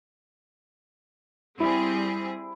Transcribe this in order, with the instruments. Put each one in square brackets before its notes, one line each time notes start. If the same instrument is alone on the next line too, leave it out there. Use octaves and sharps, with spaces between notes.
[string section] G3 C4 G#4 [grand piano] E4